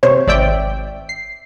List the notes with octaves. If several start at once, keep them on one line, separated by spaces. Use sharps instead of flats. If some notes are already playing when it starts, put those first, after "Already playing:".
C3 C5 C#5
G#1 D5 E5 G5
C7